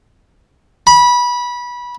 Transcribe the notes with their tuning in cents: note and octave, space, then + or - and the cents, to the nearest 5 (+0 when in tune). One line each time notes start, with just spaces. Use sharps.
B5 -20